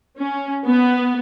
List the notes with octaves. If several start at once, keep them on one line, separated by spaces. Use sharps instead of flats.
C#4
B3